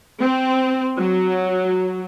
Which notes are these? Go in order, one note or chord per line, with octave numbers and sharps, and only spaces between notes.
C4
F#3